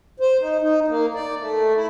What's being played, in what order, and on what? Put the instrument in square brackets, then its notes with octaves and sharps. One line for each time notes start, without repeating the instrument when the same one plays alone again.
[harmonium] C5
D#4
D#4
A#3
D5
A3
E4